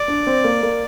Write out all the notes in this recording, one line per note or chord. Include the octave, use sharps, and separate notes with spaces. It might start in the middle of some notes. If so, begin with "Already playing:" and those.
Already playing: D5
D4
C4
A#3
A#3